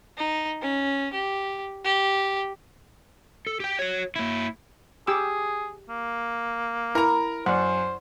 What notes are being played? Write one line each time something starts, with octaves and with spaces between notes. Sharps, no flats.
D#4
C#4
G4
G4
A4
G4 G5
F#4 C#5
A#3 E4
G4 G#4 D6 E6
A#3
E4 A#4 A#5
F#2 C5 D5 F#5